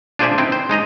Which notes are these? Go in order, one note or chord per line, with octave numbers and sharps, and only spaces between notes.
D4 F4 G#4 C5 D5 E5
C4 D#4 E4 G5
C5
G#3 D#4 D#5 A#5